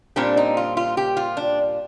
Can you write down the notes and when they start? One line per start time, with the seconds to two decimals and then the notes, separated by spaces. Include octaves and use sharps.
0.16 A#2 G3 C4 D4
0.37 D#4
0.57 F4
0.77 F4
0.97 G4
1.17 F4
1.37 D4